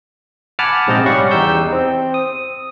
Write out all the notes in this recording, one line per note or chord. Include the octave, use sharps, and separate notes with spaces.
F#5 G#5 A5 B5 D6 F6
A#1 G#2 C3 C4 C5 D#5
G3 C#4 D5 F5 F#5 C#6
E2 D#4 G4 E6 G6
C4
D#6